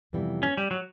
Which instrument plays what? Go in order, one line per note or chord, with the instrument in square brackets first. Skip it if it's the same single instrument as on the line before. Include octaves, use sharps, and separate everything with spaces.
[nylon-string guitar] F2 C3 E3 G3 B3
[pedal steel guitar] C#4
G3
F#3